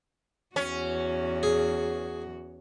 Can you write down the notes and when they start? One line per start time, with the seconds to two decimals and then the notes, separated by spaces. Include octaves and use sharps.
0.56 E2 C#4 F#4
1.43 G#4